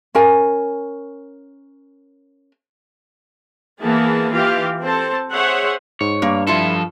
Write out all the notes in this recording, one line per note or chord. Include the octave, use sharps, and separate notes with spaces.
C#4 A#4 G#5
E3 A#3 B3 G#4 A5
E3 F4 G4 F5
C4 A4 C5 A5
G#4 C5 C#5 E5 F#5
G#2 C#5
G2 A#3
F3 E4 F4 A4 E5